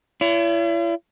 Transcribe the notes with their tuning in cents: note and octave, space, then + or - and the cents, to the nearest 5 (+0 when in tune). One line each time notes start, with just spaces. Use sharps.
E4 +40 C#5 +45